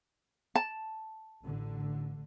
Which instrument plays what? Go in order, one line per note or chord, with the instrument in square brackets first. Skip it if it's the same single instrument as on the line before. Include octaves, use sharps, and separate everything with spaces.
[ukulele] A5
[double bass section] A1 D3